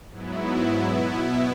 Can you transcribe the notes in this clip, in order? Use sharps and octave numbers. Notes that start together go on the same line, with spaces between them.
G#2 F#3 B3 E4
B2 B3 E4